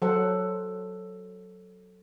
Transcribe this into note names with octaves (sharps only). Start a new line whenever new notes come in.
F#3 A4 C5 F#5